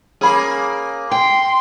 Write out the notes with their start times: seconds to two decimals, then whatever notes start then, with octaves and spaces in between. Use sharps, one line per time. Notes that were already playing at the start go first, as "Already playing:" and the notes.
0.21 A#3 C#4 G#4 B5
1.11 G5 C6